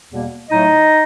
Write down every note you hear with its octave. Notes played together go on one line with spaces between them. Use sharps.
E2 B2 G3 A#3
A2 F#3 A3 D#4 D#5